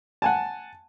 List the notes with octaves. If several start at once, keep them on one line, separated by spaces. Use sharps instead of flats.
F#5 G#5 A5